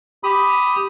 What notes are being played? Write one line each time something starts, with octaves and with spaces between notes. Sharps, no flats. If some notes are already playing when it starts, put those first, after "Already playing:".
G4 B5 D#6